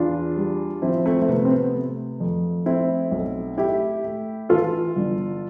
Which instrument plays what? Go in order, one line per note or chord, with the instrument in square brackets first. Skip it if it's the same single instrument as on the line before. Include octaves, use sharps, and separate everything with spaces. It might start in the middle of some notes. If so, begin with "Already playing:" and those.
Already playing: [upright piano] E2 D4 F4
G3
F3 C4 E4
A3 C4
A3
C3 B3
C4
B3
A3
F2
A3 C4 E4
B1
A3 E4 G4
A3
E3 F4 A4
G1